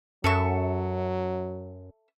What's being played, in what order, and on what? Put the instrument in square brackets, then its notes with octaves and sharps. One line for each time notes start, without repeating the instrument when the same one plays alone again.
[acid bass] F#2 [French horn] F#3 [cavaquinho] A4 E5 C#6